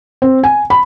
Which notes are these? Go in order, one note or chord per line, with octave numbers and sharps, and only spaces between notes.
C4
G#5
B5